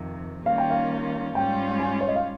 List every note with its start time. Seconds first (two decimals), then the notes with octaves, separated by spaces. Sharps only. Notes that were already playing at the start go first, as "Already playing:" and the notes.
Already playing: F2 C3 D#3
0.46 D#3 G3 A#3 C#4 F4 F5
0.58 G5
0.70 F5
1.35 G#2 G3 C#4 F4 G5
1.80 G#5
2.01 C#5
2.08 D#5
2.16 F5